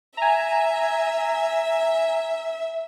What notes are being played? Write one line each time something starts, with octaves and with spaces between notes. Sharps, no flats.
E5 G#5 A#5